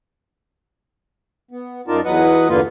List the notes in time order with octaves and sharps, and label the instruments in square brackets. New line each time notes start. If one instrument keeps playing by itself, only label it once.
[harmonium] B3
F#2 D#4 F4 A#4 D5 A5
E2 F#3 B4 D#5 F#5
E2 G2 D3 A#3 F4 B4